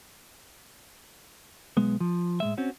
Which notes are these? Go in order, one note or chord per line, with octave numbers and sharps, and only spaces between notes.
B1 G#3 B3
F3
A2 G#3 E5
C4 C#4 F#4